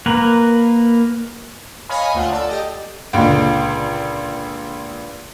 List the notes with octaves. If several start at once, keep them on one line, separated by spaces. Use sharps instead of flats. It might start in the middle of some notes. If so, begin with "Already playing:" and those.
A#3 A#4 B4
C#5 D#5 F5 G#5 B5
D2 A3 F4 F#5
A4 D5
G4 D#5
C#2 A#2 D3